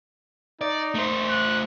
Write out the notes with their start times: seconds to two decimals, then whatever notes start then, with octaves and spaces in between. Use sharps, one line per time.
0.61 D#4 D5
0.95 A3 C5
1.30 F#6